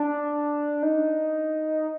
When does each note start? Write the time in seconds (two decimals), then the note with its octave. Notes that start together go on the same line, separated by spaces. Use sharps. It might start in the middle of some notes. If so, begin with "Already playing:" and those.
Already playing: D4
0.83 D#4